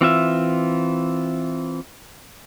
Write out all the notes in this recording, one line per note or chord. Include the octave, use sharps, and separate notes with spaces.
E3 C4 F4 E5